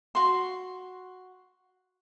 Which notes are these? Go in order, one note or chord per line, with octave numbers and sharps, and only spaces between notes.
F#4 C6